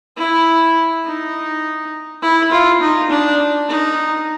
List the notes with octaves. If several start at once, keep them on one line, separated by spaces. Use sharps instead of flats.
E4
D#4
E4
F4
D#4
D4
D#4